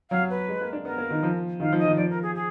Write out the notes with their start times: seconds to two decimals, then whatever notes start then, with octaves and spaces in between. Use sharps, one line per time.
0.10 F#3 F5
0.30 B4
0.48 G#3
0.61 A#3
0.73 D4
0.85 B3 A#4
0.98 A#3
1.10 D#3
1.23 F3
1.60 D#3 F5
1.72 F3
1.79 D#5
1.85 D#3
1.96 F3 D5
2.10 A#4
2.23 G#4
2.35 G#4